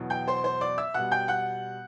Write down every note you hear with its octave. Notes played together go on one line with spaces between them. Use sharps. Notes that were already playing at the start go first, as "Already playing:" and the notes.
Already playing: E2 B2 F#3
G5 G6
C5 C6
C5 C6
D5 D6
E5 E6
B2 G3 F#5 F#6
G5 G6
F#5 F#6